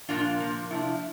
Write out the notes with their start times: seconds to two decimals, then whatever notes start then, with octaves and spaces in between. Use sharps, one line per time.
0.09 A#2 F3 A#3 D4 F4
0.40 A#2 F3 A#3
0.70 C3 F3 A3 D4 E4